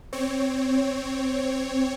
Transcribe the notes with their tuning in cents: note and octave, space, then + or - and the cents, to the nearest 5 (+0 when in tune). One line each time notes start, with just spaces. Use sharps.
C4 +0 C#5 +0